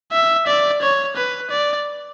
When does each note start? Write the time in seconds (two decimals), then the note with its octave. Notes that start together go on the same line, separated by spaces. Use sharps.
0.12 E5
0.47 D5
0.82 C#5
1.16 B4
1.50 D5